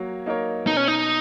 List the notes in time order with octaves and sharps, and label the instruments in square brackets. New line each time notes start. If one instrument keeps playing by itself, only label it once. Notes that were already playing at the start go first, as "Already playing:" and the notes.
Already playing: [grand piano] F#3 A#3 C#5
A#3 D#4 A#4 C#5
[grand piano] B2 [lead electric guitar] D#4
[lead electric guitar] C#4
D#4